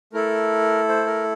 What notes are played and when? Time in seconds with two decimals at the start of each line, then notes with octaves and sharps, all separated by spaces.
0.13 A3 E4 A4 A#4
0.89 C5
1.07 A#4